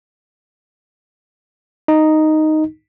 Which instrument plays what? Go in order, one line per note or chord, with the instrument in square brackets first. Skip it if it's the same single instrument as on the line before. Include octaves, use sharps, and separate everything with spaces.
[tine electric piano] D#4